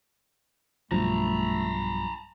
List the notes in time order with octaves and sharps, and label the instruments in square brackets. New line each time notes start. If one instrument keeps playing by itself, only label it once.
[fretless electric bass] B1 G2 F3 [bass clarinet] A3 [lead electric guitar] A5 A#5